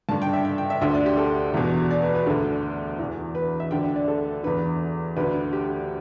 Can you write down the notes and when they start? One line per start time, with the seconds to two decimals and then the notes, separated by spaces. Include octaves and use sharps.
0.09 G2 D3 A5
0.22 G5
0.33 E5
0.45 G5
0.58 G5
0.70 E5
0.81 D2 D3 E5
0.94 D5
1.06 G4
1.17 A4
1.54 E2 B2
1.90 D5
2.02 B4
2.15 B4
2.26 D2 D3 A4
2.99 E2 E3
3.35 B4
3.60 E5
3.71 D2 D3 G5
3.84 E5
3.96 D5
4.08 A4
4.44 E2 D3 B4
5.16 D2 D3 B4
5.53 G4